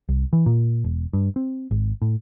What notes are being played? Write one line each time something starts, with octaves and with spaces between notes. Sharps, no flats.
C2
E3
A#2
E1
G2
C4
G#1
A2